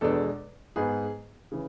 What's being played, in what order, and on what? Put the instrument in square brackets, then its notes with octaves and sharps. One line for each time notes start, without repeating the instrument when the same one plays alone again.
[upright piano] E2 B2 G#3 D4 A4
G#2 G#3 B3 G#4
C#3 E3